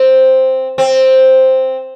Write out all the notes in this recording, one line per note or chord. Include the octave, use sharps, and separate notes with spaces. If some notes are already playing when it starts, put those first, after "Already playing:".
Already playing: C4
C4